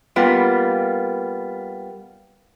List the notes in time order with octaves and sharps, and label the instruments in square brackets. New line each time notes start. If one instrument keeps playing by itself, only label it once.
[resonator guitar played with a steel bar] G3 A#3 B3 F4